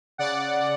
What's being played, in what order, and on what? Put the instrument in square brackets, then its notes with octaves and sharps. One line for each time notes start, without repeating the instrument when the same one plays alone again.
[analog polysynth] C#3 D5 F#5